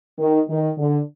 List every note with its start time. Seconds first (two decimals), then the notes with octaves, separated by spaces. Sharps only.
0.19 D#3
0.49 D#3
0.78 D3